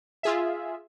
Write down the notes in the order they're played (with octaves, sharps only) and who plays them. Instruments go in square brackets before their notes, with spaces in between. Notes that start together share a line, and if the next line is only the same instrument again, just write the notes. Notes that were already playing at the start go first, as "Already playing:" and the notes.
[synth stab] F4 G#4 E5